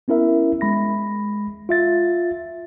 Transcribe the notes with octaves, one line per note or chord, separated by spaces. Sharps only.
B3 C#4 E4 A#4 E5
G#3 B5 A#6
F4 E5 A6